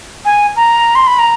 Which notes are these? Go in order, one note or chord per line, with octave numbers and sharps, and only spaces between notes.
G#5
A#5
C6
B5
A#5